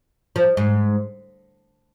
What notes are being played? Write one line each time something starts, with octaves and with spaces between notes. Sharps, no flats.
F3
G#2